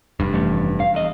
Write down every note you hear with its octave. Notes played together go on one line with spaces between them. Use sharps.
F1 G2
E3 A3 C#4
F5
E2 D#5